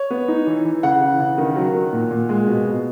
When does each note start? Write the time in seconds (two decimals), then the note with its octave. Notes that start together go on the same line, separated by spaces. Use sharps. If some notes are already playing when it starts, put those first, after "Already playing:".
Already playing: C#5
0.10 B3
0.28 D#4
0.47 E3
0.65 E3
0.83 C#3 F#5
1.01 E3
1.20 C#3
1.38 D#3
1.56 F#3
1.75 D#3
1.93 A#2
2.11 A#2
2.29 G#3
2.47 B2
2.66 B2